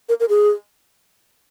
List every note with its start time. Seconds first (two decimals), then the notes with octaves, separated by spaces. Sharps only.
0.09 A#4
0.20 A#4
0.29 G#4